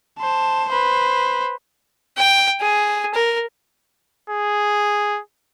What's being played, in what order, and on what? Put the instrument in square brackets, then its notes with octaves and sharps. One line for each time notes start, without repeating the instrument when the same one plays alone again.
[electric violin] C5 A5
B4 C5
[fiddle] G5
G#4
A#4
[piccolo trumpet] G#4